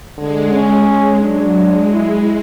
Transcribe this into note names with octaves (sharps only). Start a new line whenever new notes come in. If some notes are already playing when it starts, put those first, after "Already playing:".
D3 G#3
C#4
G#3
F#3 D4
G#3
E4